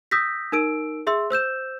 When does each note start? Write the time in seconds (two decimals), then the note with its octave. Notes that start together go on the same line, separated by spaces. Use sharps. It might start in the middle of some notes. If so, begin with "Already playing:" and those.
0.11 D#6 E6 G6 A#6 B6
0.52 D#4 A#4 E6 D7
1.07 G#4 E5 C6 E6
1.31 C5 E6 G6 E7